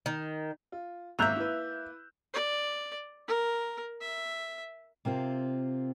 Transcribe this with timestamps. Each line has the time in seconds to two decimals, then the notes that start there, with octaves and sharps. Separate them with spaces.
0.06 D#3
0.72 F4
1.19 G#1 A#3 E5 A#5 E6 F#6 G6 F7
1.36 E4 B4
2.34 D5
3.28 A#4
4.01 E5
5.05 C3 A#3 C4 F4